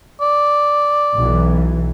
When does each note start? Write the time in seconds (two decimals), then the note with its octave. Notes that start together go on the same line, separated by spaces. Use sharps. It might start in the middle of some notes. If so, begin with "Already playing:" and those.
0.21 D5
1.17 B1 E3